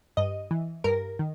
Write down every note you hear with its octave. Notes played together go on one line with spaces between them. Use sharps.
G2 D#5
E3
G2 A#4
D#3